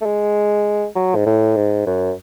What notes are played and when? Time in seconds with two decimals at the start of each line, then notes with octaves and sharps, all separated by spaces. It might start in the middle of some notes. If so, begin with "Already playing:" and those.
0.01 A3
0.06 G#3
0.96 F#3
1.16 G#2
1.26 A2
1.56 G#2
1.86 F#2